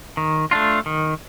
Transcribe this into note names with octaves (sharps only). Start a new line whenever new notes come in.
D#3
A3 D4 F4
D#3